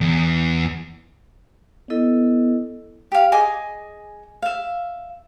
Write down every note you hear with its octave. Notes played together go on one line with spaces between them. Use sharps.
E2
B3 E4 A4 D#5
G4 F5
G#4 D#5 G#5 D6
E5 F5